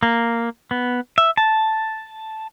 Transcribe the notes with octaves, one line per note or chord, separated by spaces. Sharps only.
A#3
B3
E5
A5